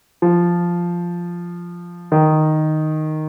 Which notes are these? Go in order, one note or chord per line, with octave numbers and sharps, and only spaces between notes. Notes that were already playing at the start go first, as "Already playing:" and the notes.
F3
D#3